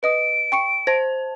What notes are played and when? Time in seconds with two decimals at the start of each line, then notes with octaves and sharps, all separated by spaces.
0.03 B4 D#5 D#6 D7
0.52 G5 C#6 C#7
0.87 C5 A5 A#6